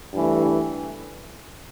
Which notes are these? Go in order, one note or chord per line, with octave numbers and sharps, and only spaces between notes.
G2 E3 A3